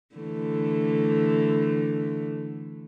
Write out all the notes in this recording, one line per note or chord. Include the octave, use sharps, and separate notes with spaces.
D3 E3 A3